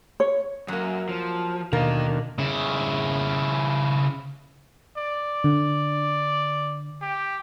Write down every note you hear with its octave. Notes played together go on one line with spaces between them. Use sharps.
C#5
F#2 F#3 A#3
F3
D#2 B2 D3 A#3 A#4 D#5
C#3 E4
D5
D3
G4